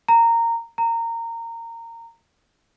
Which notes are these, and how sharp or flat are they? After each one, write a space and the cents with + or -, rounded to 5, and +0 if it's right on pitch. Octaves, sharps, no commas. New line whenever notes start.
A#5 -15
A#5 -20